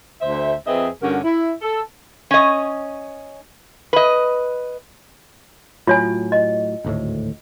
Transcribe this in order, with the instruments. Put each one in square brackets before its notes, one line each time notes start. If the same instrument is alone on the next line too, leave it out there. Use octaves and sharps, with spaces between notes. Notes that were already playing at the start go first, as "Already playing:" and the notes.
[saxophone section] D2 C5 E5
F2 C4 G#4 B4 D#5 E5
G2 D3 C#4 F#4 G4 A#4
E4
A4
[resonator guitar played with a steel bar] C#4 D#5
B4 D#5
[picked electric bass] A2 F#3 [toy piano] F4 C#5 G#5
[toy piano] D#5
[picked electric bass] G#1 D2 A2